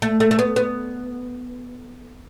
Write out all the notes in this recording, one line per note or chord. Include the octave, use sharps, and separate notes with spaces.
A3
A3
A3
B3
B3